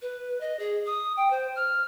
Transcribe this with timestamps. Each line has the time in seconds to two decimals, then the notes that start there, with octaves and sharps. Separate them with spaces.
0.02 B4
0.41 D#5
0.59 G#4
0.86 D#6
1.17 G5
1.31 C5
1.56 F6